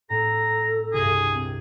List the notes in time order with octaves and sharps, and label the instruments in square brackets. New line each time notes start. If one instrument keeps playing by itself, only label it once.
[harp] A2 C4 [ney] A4 [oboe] A#5
[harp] C2 G2 [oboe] G#4
[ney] C4